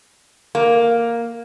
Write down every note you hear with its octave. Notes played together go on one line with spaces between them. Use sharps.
A#3